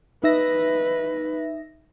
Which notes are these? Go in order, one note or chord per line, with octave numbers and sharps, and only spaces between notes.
D#4 B4 E5 A#6